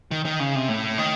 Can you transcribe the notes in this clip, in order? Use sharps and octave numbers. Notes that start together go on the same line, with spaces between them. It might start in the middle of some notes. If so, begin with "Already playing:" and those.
D#3
D#3
C#3
C3
A2
D#3